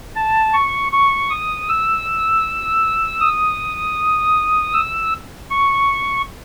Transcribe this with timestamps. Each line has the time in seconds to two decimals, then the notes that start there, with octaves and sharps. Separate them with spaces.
0.16 A5
0.53 C#6
0.92 C#6
1.30 D#6
1.68 E6
3.20 D#6
4.73 E6
5.50 C#6